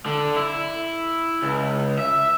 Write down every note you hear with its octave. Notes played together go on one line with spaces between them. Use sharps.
D3
E4
C#2
E5